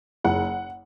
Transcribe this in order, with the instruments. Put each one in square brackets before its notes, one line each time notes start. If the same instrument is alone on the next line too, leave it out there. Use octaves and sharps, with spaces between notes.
[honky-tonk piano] F#1 F#5